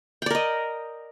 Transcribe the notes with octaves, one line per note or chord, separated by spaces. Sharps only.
A#4 D5 D#5 G5